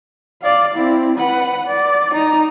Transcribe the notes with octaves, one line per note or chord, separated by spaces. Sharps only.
D5 F5
C4 E4
B4 F#5
D5
D#4 A#5